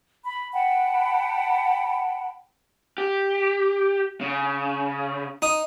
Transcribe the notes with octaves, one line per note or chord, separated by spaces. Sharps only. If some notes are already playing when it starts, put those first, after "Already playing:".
B5
F#5 G5 A5 B5
G4
C#3
D#4 D#6